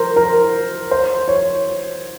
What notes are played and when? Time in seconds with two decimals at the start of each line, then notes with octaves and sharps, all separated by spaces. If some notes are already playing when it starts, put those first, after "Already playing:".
Already playing: A#4 C5
0.16 A#4
0.91 C5
1.28 C#5